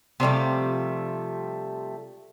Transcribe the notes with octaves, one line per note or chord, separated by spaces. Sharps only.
C3 F3 G3 A3